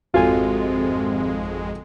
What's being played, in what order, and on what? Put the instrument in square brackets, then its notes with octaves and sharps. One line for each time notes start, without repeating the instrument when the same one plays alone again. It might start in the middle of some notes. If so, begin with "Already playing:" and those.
[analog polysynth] G#1 F2 G#3 [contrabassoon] C3 [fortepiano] F4 G#5 [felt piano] F#4 A4